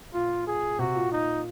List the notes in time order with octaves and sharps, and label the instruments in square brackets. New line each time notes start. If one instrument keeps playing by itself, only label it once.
[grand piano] A#2 [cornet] F4
[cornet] G#4
[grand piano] C3 [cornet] F#4
[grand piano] A#2
[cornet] D#4